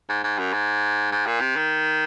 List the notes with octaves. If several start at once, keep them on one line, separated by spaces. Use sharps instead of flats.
G#2
G#2
F#2
G#2
G#2
A#2
C3
D#3